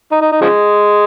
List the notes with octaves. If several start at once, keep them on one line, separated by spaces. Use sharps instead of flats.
D#4
D#4
D#4
C#3 F3 G#3